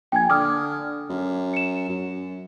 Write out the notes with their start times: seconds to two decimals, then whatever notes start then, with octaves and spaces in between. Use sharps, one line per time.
0.12 A#1 G5 G#5 G#6
0.30 D3 D6 D#6 F6
1.09 F#2
1.53 C#7 E7
1.89 F#2